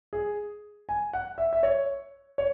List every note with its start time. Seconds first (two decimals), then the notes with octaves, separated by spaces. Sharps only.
0.13 G#4
0.89 G#5
1.13 F#5
1.38 E5
1.53 E5
1.63 C#5
2.38 C#5